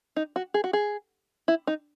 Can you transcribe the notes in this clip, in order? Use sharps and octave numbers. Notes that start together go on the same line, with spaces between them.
D#4
F#4
G#4
F#4
G#4
E4
D#4